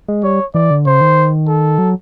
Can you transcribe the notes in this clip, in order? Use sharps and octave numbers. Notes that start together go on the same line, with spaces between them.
G#3
G3 C#5
E3 D5
D3
C#3 C5
D#3
A4
F#3